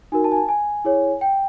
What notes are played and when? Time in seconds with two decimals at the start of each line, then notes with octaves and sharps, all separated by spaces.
0.12 D#4 F#4 A#4 G#5
0.24 A5
0.32 G#5
0.37 A5
0.49 G#5
0.85 E4 G#4 C#5
1.21 G5